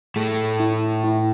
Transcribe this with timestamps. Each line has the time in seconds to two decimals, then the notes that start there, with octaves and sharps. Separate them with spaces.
0.16 A2 A3 G#4
0.60 E4
1.04 E4